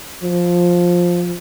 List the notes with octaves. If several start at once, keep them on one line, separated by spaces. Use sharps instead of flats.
F3